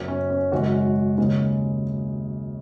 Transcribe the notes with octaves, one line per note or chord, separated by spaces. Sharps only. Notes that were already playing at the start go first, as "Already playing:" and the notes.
Already playing: F#1 F#2 F#3
C#4
C#4
G#1 F#2 C#3 G#3 F#4
D#2 C#3 G#3